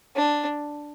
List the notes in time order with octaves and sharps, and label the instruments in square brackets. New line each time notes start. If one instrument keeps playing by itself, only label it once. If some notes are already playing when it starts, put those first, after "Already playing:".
[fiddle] D4